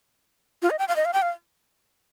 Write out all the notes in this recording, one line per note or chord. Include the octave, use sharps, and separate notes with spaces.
F4
D#5
G5
F5
D#5
F5
G5
F5